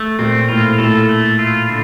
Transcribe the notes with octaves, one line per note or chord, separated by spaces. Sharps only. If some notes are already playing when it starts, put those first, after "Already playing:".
Already playing: A3
A#2 C4
A2 F4
A2 A4
A3
F4
D3